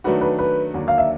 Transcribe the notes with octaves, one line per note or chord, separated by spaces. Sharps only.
D#3 F#3 A3 D4 F#4 B4
B4
B4
D#2 D3 F#3 A#3 D4
F5
E5